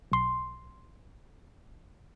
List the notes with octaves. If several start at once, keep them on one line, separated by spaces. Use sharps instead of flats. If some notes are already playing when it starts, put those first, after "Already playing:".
B1 C6